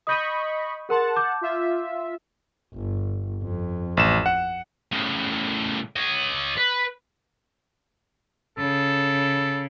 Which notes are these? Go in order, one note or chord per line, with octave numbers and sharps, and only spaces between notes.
D#5 B5 C#6 D#6 G6 D#7
G#4 A#4 F#5 A5 C6
D6 G6
F4 E5
G1
F2
A1 E7
F#5
A2 C#3
C#5 D#5
B4
C#3 A4